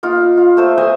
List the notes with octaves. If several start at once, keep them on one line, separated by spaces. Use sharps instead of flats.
A#3 D#4 F4
F4
A3 C5 E6
C5 D#5 E5 G#5